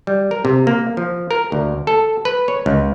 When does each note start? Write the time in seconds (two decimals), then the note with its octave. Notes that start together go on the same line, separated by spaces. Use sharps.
0.07 G3
0.31 A#4
0.45 C3
0.67 A#3
0.97 F3
1.31 A#4
1.52 D2
1.87 A4
2.25 B4
2.48 C#5
2.66 C#2